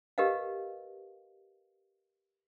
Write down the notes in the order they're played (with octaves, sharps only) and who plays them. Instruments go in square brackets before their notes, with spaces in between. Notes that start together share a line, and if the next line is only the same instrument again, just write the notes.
[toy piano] G4 A#4 B4 D#5 F5